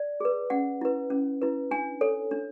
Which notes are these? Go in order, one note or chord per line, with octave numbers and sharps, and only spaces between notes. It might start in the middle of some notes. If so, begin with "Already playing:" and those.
Already playing: D5
G#4 B4
C#4 F#5
E4 B4
C#4
E4 B4
D4 G#5
A4 C#5
D4